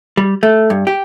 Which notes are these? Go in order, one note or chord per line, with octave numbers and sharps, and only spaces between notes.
G3
A3
G2
G4